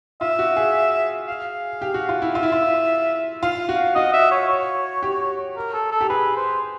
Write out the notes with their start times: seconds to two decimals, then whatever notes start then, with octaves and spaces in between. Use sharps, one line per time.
0.21 F4 E5
0.39 F#4
0.56 G#4
1.28 F5
1.82 G4
1.94 F#4
2.09 F4
2.22 E4
2.35 F4 E5
2.43 E4
2.52 F4
3.43 F4 F5
3.69 F#4
3.95 F#4 D#5
4.13 E5
4.31 C#5
4.48 C#5
5.03 G4
5.57 A#4
5.73 A4
5.91 A4
6.01 G4
6.09 G#4 B4
6.36 C5